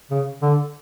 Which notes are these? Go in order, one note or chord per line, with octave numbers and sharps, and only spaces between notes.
C#3
D3